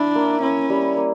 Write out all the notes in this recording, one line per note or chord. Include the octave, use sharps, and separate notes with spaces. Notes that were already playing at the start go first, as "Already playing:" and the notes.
Already playing: D4 E4
A#3
C#4 E4
G3
A#3